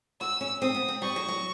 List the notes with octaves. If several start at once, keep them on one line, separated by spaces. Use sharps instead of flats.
F#4 E6
C#4
C4 D#6
B3
C4
G3 C#6
F#3
F#3